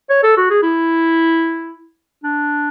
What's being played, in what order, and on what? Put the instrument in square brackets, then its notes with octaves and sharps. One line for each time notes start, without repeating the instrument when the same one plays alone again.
[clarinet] C#5
A4
F#4
G#4
E4
D4